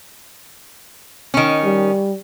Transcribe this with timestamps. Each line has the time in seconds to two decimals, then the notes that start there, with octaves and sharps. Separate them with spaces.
1.34 D#3 C#4
1.64 G3